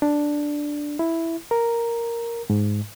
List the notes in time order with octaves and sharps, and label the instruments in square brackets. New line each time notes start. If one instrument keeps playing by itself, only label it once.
[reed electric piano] D4
E4
A#4
G#2